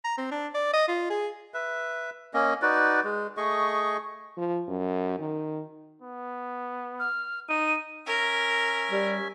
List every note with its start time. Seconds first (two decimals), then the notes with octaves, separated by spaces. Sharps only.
0.04 A#5
0.18 C4
0.31 D4
0.54 D5
0.74 D#5
0.88 F4
1.10 G#4
1.54 B4 E5
2.34 A#3 C#4 D#5
2.62 D#4 F#4 B4 D5
3.04 G#3
3.37 A3 G#4 D#5 C#6
4.37 F3
4.69 F#2
5.19 D#3
6.02 B3
7.00 F6
7.49 D#4 D#7
8.06 C#4 A#4 E5 G#5
8.91 G3